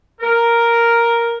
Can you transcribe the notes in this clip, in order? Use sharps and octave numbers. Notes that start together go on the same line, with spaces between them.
A#4